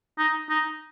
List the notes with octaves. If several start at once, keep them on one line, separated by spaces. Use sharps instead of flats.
D#4
D#4